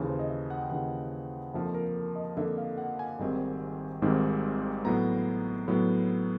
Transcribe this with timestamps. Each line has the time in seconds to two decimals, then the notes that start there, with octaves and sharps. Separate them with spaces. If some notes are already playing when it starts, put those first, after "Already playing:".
Already playing: D#2 C#3 E3
0.09 C5
0.19 D#5
0.30 E5
0.50 F#5
0.60 G5
0.70 D#2 C#3 E3 F#5
1.54 F2 D3 F3 A#3 D#4 E5
1.75 A#4
1.96 A#4
2.15 D#5
2.37 F2 D3 F3 A#3 D#4 E5
2.58 F5
2.78 F#5
2.99 G#5
3.19 G#1 G#2 D#3 G3 C4
4.02 G#1 G#2 D#3 G3 C4
4.85 A2 F#3 B3 A#5
5.68 A2 F#3 B3